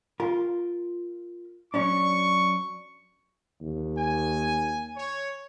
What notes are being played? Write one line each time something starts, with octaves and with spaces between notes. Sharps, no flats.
F4 A#4
F#3 C#4 D4 C#6
D#2
G#5
C#5